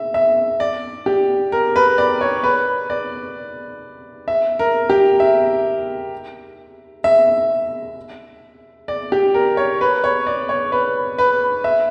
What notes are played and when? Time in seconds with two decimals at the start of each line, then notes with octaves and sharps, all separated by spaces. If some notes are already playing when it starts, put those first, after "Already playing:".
Already playing: E5
0.14 E5
0.60 D5
1.06 G4
1.52 A#4
1.76 B4
1.98 D5
2.21 C#5
2.43 B4
2.90 D5
4.28 E5
4.59 A#4
4.90 G4
5.20 E5
7.04 E5
8.88 D5
9.12 G4
9.34 A#4
9.57 C#5
9.81 B4
10.04 C#5
10.27 D5
10.49 C#5
10.72 B4
11.18 B4
11.64 E5